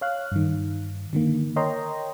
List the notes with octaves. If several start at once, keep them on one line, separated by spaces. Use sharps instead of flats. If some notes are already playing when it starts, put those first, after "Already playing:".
C#5 F5 F#6
G2 D#3
D3 D#3 A#3
A#4 C#5 D#5 G5 A#5 C6